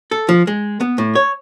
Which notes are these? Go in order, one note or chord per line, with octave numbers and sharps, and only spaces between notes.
A4
F3
G#3
B3
A2
C#5